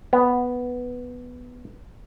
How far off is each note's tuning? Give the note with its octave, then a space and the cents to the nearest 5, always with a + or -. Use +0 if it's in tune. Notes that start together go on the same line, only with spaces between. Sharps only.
B3 +0